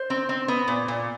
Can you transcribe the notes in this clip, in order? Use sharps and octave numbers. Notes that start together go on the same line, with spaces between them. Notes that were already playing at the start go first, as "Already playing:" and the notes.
Already playing: C5
C4
C4
B3
A#2
A#2